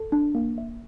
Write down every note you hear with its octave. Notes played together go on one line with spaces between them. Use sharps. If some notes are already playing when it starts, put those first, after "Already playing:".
Already playing: A4
D4
A#3
E5